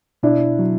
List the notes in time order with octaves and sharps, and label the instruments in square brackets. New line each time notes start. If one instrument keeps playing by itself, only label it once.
[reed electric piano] B2 [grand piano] D4 E4
[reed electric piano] F#3